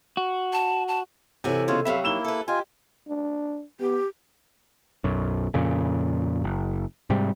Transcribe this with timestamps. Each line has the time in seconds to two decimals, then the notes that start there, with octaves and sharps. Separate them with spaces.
0.17 F#4
0.53 A5
0.88 A5
1.44 C3 E3 F#4 A4 C#5 G#5
1.68 C#3 G#3 B3 F4 C#5
1.85 F2 C3 F#3 E5 F5 B5
2.04 A#3 D#4 E4 E6 E7 G7
2.24 A4 B4 E5
2.48 F4 G4 D#5 G#5
3.08 D4
3.80 B3 G4
5.04 B1 F#2
5.54 F2 A#2 C#3
6.44 F#1
7.10 G#2 C3 G3